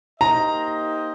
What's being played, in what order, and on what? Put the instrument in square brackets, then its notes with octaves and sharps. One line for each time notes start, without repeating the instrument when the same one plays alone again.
[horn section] A#3 D#4 G4 C5 D#5 [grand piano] A#5